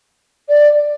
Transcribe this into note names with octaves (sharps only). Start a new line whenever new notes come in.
D5